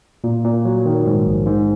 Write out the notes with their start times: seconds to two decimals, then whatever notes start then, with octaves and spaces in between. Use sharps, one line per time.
0.24 A#2
0.44 A#2
0.65 F#3
0.86 D#3
1.06 G#2
1.26 A#1
1.46 G#2